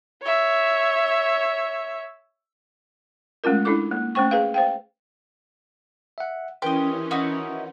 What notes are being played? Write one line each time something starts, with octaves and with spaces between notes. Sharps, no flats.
C#5 E5
G#3 A3 C#4 F4 A#4
D4 E4 A4 D6
A#3
A3 C#4 C5 G5 C#6
G#4 B4 F5
C5 F5 G5
E5 F#5
E3 C#4 G4 A#4 B4 D#5 C6
D#4 E4 F#4